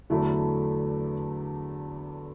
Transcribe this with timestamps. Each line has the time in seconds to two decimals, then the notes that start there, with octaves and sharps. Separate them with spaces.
0.10 E2 D3 F#3 A3 E4